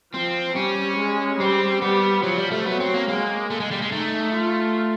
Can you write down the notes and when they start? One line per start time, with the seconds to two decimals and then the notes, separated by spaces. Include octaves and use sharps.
0.14 F3 C4
0.56 G3 C#4
0.98 G#3
1.40 G3 C4
1.82 G3 B3
2.24 F3 F#3
2.38 G3
2.52 A3
2.66 F#3 B3
2.80 C4
2.94 A#3
3.08 G#3 A#3
3.50 A3
3.60 G#3
3.71 G3
3.82 G#3
3.92 A3 D#4
4.34 F4